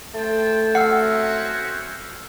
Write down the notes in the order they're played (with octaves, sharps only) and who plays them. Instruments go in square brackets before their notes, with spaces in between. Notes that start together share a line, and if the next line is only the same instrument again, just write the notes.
[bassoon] A3 [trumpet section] C5 G5 A5
[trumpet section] C4 C#4 F#4 [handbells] F#5 [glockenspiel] E6 F6 C7